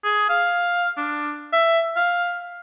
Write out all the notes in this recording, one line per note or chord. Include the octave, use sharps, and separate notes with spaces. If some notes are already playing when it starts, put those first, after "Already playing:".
G#4
F5
D4
E5
F5